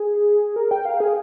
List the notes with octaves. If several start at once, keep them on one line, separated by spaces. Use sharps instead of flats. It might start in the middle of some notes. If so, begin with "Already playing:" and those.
Already playing: G#4
A#4
G5
F5
G#4